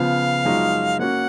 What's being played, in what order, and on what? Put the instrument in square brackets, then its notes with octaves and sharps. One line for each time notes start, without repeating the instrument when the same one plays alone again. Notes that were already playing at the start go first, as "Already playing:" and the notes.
Already playing: [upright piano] C#3 F3 B3 [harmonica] F5
[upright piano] F#2 F3 G#3 D#4 F#4
[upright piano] A#3 C#4 F#4 [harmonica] F#5